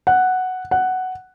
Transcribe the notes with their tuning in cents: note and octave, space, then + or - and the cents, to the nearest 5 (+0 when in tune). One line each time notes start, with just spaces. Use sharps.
F#5 +0
F#5 +5